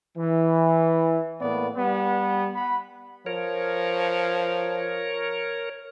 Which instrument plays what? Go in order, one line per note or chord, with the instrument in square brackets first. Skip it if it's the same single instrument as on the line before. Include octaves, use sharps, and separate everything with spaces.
[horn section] E3
A2 A#3 B3 D5
G3 B3
F#5 B5
[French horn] F3 [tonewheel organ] A#4 C#5